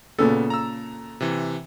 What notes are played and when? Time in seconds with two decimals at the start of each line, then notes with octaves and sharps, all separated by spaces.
0.18 A#2 C#3 B3 A4
0.50 A#5 E6
1.21 C3 E3